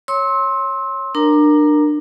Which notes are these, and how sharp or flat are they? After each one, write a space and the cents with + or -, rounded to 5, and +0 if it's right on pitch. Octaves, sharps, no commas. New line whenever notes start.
C#5 -5 C6 +20 E6 -25
D4 +25 A#4 +0 A#5 +0